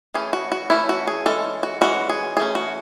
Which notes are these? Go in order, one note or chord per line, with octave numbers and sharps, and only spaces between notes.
E3 A3 C#4 G#4
F#4
F#4
E3 A3 C#4 E4
F#4
G#4
E3 G#3 C#4 A4
F#4
E3 G#3 C#4 F#4
G#4
E3 A3 C#4 G#4
F#4